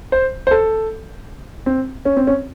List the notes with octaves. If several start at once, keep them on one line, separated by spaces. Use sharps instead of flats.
C5
C5
A4
C4
C#4
C4
C#4